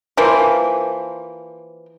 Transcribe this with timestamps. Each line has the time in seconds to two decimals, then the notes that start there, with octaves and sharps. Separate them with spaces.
0.17 E3 F3 A#3